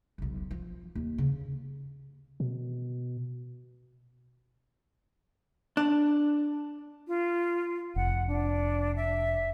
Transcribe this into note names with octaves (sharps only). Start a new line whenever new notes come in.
E1 B1
F3
D#2
C#3 E3
B2
D4
F4
F1 F#5
D4
E5